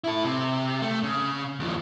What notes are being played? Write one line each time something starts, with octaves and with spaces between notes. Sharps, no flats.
E4 A4
C3
A3
C#3
D#2 F3